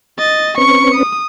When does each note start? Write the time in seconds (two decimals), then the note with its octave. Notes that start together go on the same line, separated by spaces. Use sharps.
0.18 D#5 A6
0.58 C4 C#4 B4 C#6 C#7
0.95 D#6